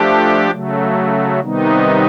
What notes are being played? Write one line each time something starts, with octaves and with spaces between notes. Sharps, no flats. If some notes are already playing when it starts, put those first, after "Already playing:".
Already playing: F3 A3 D4 G4
C#3 F#3 A3
C3 D#3 G3 B3 D#4